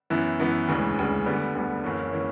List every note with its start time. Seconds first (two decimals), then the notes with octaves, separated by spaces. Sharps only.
0.10 F#2 E3 B3 E4
0.40 F#2 E3 B3 E4
0.68 E1 D2 C#3 E3
0.97 E1 D2 C#3 E3
1.26 D2 D3 G3 B3
1.55 D2 D3 G3 B3
1.84 F#1 F#2 E3 A#3 C#4
2.13 E3 A#3 C#4